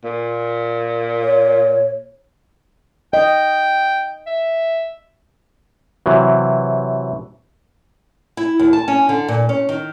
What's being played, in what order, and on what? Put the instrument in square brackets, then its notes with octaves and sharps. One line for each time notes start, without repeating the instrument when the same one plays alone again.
[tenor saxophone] A#2
[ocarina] C#5
[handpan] D#5 [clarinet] G5
[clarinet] E5
[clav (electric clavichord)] C3 E3 F#3
[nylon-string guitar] E4
D#2
A5
C#4
D3
A#2
C#4
D#3